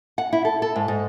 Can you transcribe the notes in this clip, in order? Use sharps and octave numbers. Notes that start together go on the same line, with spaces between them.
F#5
E4
A4
A4
G#2
G#2